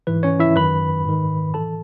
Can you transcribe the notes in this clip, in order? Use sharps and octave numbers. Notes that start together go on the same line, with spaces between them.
G#2 E3 B4
C#4 C#5
E4 E5
F#2 D#3 B4 B5
G#2 D#3
A2 E3 A4 A5